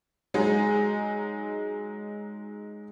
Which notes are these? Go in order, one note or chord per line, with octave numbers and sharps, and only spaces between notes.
F#3 G#3 D#4